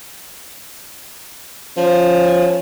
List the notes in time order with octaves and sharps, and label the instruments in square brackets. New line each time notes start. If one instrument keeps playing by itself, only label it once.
[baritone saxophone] F3 [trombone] C#4